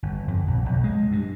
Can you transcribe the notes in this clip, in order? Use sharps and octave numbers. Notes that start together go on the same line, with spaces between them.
G1
F2
A#1
B1
G#3
G2